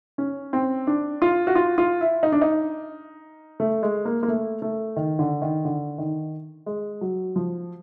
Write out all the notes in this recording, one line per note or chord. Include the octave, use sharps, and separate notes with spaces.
C#4
C4
D4
F4
F#4
F4
F4
E4
D#4
D4
D#4
A3
G#3
A#3
A#3
A3
A3
D#3
D3
D#3
D3
D#3
G#3
F#3
F3